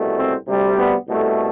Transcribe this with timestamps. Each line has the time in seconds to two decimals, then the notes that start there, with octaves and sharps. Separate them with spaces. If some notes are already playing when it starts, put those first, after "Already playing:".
Already playing: C2 B2 A3
0.17 C4
0.48 D2 C3 G3
0.77 B3
1.07 C2 B2 A3